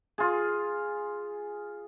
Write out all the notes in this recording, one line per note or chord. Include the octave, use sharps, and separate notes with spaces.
F4 G#4